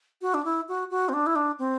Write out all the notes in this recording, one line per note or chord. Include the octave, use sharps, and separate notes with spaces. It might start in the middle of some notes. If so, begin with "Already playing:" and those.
F#4
D4
E4
F#4
F#4
C4
D4
E4
D4
C4